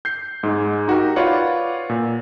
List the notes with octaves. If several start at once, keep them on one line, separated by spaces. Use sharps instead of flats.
G6 C7
G#2 G#3
D#4 F#4 G4 A#4
F4 B4 C#5 D5 F#5
A#2